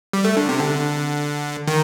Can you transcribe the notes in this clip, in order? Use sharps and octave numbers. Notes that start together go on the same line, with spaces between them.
G3
A3
D3
C3
D3
D#3